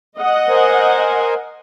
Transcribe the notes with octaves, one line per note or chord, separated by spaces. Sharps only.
D#5 F#5
A#4 C5 G#5